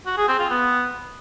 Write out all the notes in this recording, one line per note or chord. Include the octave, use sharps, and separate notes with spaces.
F#4
G#4
C4
F4
B3